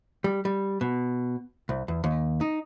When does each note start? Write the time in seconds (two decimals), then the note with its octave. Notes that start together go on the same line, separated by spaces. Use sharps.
0.24 G3
0.45 G3
0.81 B2
1.69 C2
1.88 E2
2.04 D#2
2.41 D#4